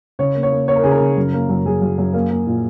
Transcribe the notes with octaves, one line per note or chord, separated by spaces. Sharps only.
C#3 C#5
A#3
C#5
A#3
A#3 C#5
A#4
C#3 G#4
A#4
C#3
F#2
A#3
F#2
F#2 G#4
F#2
F#2
A#3
A#3
A#2